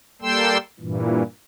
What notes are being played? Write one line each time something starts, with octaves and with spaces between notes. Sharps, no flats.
G3 A#3 A4 G5 C6 E6
G2 A#2 E3